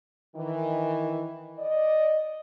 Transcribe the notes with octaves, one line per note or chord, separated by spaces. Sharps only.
D#3 E3
D5 D#5